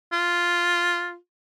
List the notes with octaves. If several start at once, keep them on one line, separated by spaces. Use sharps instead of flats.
F4